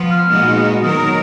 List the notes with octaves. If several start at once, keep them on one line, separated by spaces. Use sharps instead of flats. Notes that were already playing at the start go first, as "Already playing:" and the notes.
Already playing: F3 B3 F4
F6
A#2 G#3 B3 D#4 F#4
D#3 F#3 B3 D#4 A#4 D#6